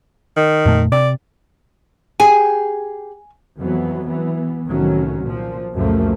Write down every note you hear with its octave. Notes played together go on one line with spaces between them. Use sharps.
D#3
F2 A#2 A3
C3 D5
G4 G#4 G#5
F2 E3 F#3 B3
E3 B3
C2 A2 D#3 F#3 C#4
A#2 F3
C#2 F#2 A#2 F3 A3 A#3